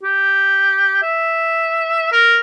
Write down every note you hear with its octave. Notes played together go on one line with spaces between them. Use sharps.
G4
E5
A#4